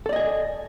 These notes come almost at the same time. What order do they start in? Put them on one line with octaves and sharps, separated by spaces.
A4 D5 D#5 G#5